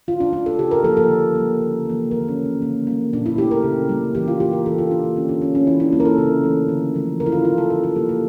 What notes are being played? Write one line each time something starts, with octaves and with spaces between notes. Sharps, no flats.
D3 F4
D4
A3 D4
A4
C#3 G4
A#4
F3 A#3 A4
A4
D3
G3 A#3
C#3
E3 A#3
D3 A#4
C#4
A3
A#3
C#3 A#3
G3 A#3
A#2 D4
E4
A3 G4
A#4
C#3
G3 A#3
E3 G4
F4
A#3 G4
A#4
E3 A4
F4
A#3 D4
A#3
D3 C#4
D4
A3 C#4
C#4
E3 E4
D4
G3 A#3 E4
A#4
A4
C#3
E3 A3
D3
F3 A3
C#3 A#4
E4
F4
E3 A#3 F4
A4
E3 A#4
A4
G3 A#3 G4
A4